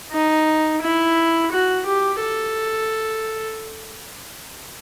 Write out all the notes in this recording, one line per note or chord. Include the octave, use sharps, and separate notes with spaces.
D#4
E4
F#4
G4
A4